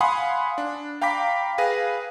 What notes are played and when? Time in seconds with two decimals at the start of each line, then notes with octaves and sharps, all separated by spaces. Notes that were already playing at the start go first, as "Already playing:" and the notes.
0.01 F5 F#5 G#5 B5 C6 D#6
0.58 D4
1.01 F5 G5 A#5 B5 D6 B6
1.58 G#4 B4 F5 A#6 D#7